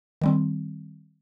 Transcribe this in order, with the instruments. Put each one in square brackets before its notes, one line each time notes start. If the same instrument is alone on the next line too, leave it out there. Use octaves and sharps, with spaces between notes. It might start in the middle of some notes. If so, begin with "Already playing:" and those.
[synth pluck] D#3 G3 C4